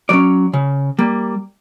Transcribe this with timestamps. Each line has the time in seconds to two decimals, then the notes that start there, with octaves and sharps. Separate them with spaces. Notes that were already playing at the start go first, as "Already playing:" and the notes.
0.09 F#3 C#4 D5
0.54 C#3
0.99 G3 A#3